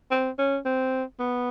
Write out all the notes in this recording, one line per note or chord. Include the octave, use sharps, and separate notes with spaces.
C4
C#4
C4
B3